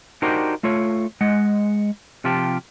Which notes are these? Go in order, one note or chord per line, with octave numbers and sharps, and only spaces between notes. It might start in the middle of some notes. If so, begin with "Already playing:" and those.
D4 D#4 F#4 G4 A#4 C5
A3 F4 A4 C#5
G#3 D#5 F#5
C3 F3 F4 G4 A5